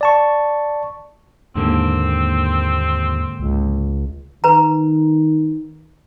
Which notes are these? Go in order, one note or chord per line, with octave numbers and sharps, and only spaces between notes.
D5 A5 C#6
D#2 G#2 D3 A#3 C4
C#2
D#3 B4 A#5